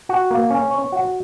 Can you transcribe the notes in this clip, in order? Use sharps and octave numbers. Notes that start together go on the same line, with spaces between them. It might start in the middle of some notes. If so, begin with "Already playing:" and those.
F#4
A#3
C#4
C#5
F#4